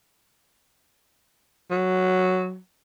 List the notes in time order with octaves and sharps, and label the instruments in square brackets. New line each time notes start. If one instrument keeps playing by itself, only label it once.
[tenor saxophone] F#3